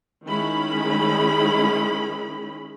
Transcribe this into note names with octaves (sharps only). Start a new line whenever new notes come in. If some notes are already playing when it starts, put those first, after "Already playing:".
D#3 G#3 C#4 E4 B5